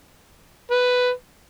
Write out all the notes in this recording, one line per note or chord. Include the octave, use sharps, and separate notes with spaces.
B4